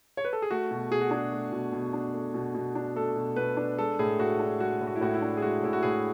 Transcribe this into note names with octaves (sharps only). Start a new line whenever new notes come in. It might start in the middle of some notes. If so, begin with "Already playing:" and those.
C#5
B4
A4
G#4
A3 F#4
B2
B2 G#4
F#4
D4 G#4
A3
B2
B2
D4
A3
B2
B2
D4
A3 A4
B2
B2 B4
D4
G#3 A4
A2 G#4
A2 F#4
D4
G#3 F#4
A2
F#4
E4
A2 F#4
E4
D4
G#4
G#3 F#4
A2 E4
F#4
A2 G#4